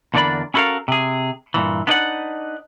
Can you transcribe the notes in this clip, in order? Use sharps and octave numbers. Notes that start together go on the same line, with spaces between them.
E2 D3 A#3 D4 D5 B5
C#4 E4 F#4 A4 A#4 F5
C3 G#4
G2 A#2 E3
B3 D4 D#4 B4 D5 F#5